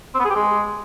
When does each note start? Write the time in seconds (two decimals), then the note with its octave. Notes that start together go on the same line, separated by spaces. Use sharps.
0.14 C4
0.20 B3
0.25 G#4
0.30 G4
0.36 G#3